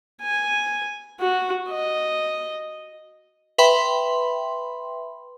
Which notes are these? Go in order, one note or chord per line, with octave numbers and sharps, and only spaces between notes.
G#5
F#4
D#5
B4 E5 G5 B5 C6